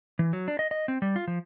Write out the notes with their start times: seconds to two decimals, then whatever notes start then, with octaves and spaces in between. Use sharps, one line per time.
0.19 E3
0.33 F#3
0.48 D4
0.59 D#5
0.71 D#5
0.88 C4
1.02 G3
1.16 F4
1.28 F3